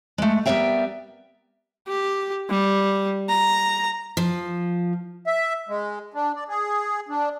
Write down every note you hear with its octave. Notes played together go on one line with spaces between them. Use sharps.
G#3 A3
G3 B3 A#4 D5 E5 G5
G4
G3
A#5
F3
E5
G#3
D4
D5
G#4
D4